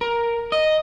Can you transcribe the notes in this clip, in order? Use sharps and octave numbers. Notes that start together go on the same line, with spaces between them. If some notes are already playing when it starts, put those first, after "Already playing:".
A#4
D#5